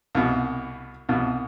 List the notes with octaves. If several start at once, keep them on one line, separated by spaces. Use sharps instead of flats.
C2 B2
C2 B2